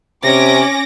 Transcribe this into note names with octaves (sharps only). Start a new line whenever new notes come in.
C3 C#4 D6 A#6